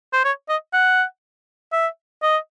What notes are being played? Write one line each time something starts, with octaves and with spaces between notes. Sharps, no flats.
C5
C#5
D#5
F#5
E5
D#5